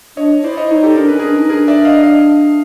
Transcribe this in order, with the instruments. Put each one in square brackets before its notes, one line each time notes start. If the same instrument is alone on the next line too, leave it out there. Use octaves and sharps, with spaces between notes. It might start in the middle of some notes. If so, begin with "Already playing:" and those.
[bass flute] D4 [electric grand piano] C#5 D#5
[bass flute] E4 [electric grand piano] C5 D5
[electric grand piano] C#5 D#5
[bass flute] D#4 [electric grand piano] C#5 D#5
[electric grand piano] G4 A4
[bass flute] D4 [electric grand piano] A#4
[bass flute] C#4 [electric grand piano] B4
[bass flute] D4 [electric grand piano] G#4 A#4
[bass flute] D#4
[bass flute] D4 [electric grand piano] G#4 A#4
[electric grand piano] D5 E5
D#5 F5
D#5 F5